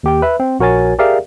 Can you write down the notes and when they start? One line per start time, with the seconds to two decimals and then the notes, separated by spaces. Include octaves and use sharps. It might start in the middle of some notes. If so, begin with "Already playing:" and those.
0.03 D#2 G4 G5
0.22 B4 E5
0.40 C4
0.60 A#1 F#4 A#4 C#5 G#5 A6
0.99 G4 G#4 A#4 D5 E5 F5